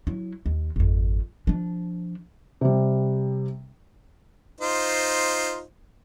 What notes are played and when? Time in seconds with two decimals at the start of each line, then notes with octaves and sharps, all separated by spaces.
0.07 F#3 E4
0.46 D#2
0.76 G#1 F2
1.47 F3 D4
2.61 C3 G3
4.61 D#4 F4 C5